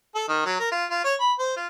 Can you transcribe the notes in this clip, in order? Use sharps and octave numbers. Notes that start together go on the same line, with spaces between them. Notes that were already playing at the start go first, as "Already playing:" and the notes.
A4
D#3
F#3
A#4
F4
F4
C#5
B5
C5
F4